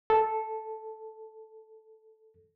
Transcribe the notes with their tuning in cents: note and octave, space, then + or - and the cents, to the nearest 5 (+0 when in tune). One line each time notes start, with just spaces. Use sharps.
A4 -5